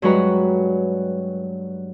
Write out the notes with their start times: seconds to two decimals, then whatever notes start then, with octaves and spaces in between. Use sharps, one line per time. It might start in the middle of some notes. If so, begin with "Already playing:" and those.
0.02 G2 F#3 G#3 F#4 B4 A#5